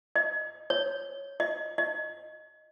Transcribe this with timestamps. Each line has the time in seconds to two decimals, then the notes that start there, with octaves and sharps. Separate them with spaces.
0.16 D#5
0.70 C#5
1.40 D#5
1.78 D#5